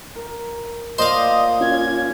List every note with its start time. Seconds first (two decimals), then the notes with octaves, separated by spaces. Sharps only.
0.16 A#4
0.99 A#2 C5 D5 D#5 F5
1.61 C#4 F4 G#5 G#6